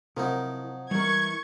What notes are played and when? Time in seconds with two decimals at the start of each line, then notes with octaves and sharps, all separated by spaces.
0.17 C3 F3 F#3 D#4 E4 A#4
0.91 E3 G3 G#3 A#4 C#6 G#6